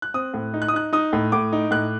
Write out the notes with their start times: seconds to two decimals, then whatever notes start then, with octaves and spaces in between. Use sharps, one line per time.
0.02 F#6
0.14 C4 D#6
0.34 A2
0.54 D#4
0.62 F#6
0.68 D#6
0.73 D#4 F#6
0.93 D#4 D#6
1.13 A2
1.32 A2 D6
1.53 D#4
1.71 A2 F#6